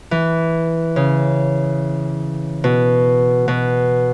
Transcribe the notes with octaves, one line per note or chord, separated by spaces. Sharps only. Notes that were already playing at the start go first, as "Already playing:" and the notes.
E3
C#3
B2
B2